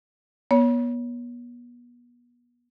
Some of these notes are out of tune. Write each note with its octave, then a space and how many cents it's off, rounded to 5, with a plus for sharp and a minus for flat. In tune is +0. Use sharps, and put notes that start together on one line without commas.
B3 -35 C#5 +15